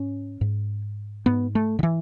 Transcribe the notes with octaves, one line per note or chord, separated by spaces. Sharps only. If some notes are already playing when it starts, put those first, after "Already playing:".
Already playing: G#2 C#4
G#2
G#2 B3
A3
D3
E3